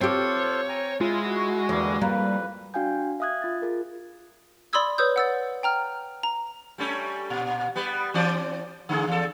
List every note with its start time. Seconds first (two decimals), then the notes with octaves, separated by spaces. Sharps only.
0.01 C4 F4 G4 A4 C5 C#5
0.69 G5 G#5 A#5
1.01 G#3 E4 F4
1.25 F#4
1.69 E2 D3 G3 A#3
2.01 F2 G3 A#3 B4
2.74 D4 F#4 F5 G5 G#5 G6
3.20 E5 F5 D#6 F#6 G#6
3.42 F4 A6
3.62 F4 G#4 A#4
4.73 D5 B5 C6 D#6 E6 G#6
4.98 B4 C#5 D#6 E6 G6
5.16 F#5 E6 A6
5.63 G5 A#5 F6
6.23 A#5
6.78 G3 A3 C#4
7.30 A#2
7.75 G3 B3
8.14 E3 C4 D5
8.89 D3 A3 G#4
9.07 E2 A4